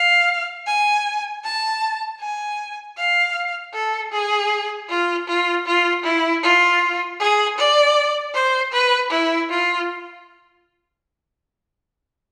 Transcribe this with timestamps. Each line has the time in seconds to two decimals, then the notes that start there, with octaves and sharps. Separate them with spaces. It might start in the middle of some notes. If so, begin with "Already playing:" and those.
Already playing: F5
0.67 G#5
1.44 A5
2.20 G#5
2.97 F5
3.74 A4
4.13 G#4
4.89 F4
5.27 F4
5.66 F4
6.04 E4
6.43 F4
7.20 G#4
7.58 D5
8.34 C5
8.72 B4
9.10 E4
9.50 F4